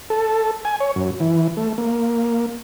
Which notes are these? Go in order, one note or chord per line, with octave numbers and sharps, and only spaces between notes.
A4
G#5
C#5
F#2
E3
A3
A#3